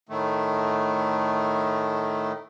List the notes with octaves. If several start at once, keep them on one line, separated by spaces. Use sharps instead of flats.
A2 D#3 A3